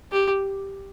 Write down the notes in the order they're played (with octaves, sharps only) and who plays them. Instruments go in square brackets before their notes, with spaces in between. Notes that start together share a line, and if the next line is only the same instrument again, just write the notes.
[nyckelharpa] G4